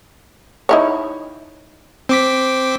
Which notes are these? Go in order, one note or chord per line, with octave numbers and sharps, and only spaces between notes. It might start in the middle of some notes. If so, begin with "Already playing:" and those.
D#4 E4 C#5
C4 D6 B6